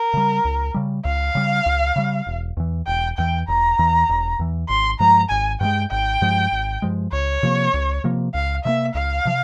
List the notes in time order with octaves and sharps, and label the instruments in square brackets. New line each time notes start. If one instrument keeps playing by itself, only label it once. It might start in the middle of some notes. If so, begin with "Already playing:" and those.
Already playing: [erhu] A#4
[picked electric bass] C#3 G3
C#2
C#3 G3
[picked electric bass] C#2 [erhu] F5
[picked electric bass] C#3 G3
C#2
C#3 G3
E1
E2 E3
[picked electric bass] E1 [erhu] G5
[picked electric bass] E2 E3 [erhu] G5
[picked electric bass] E1 [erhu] A#5
[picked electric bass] E2 E3
E1
E2 E3
[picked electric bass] G#1 [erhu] C6
[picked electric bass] G2 F3 G#3 [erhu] A#5
[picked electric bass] G#1 [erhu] G#5
[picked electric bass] G2 F3 G#3 [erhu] G5
[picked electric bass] G#1 [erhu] G5
[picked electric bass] G2 F3 G#3
G#1
G2 F3 G#3
[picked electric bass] C#2 [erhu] C#5
[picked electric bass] C3 F3 A#3
C#2
C3 F3 A#3
[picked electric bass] C#2 [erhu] F5
[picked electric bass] C3 F3 [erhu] E5
[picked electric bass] A#3
[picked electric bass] C#2 [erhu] F5
[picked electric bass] C3 F3